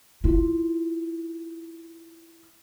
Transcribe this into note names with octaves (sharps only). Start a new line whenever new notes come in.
E4 F4